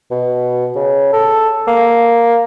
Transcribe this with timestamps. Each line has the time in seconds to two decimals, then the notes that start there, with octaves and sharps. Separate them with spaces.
0.11 B2
0.76 C#3
1.13 A4
1.68 A#3